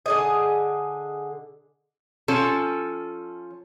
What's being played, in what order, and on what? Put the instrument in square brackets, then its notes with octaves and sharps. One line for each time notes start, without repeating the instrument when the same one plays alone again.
[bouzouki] D3 G#4 D#5
[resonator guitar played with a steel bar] F3 C#4 A4